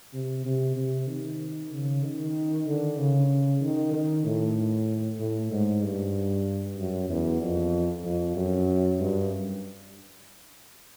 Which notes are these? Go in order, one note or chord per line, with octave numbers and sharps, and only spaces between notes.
C3
C3
C3
D#3
C#3
D#3
D3
C#3
D#3
D#3
A2
A2
G#2
G2
F#2
E2
F2
F2
F#2
G2